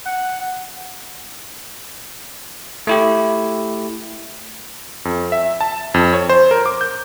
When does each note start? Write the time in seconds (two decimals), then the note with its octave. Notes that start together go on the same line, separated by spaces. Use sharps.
0.05 F#5
2.87 A3 E4 G4
5.05 F2
5.32 E5
5.61 A5
5.94 F2
6.13 C#5
6.29 C5
6.51 A#4
6.66 D6
6.81 G6